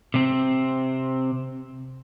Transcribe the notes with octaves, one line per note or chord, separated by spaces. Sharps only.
C3 C4